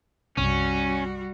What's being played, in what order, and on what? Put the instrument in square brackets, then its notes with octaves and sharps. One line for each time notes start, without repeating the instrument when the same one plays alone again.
[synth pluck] B1 F#2 C3 [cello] G3 F#4 [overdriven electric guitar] C#4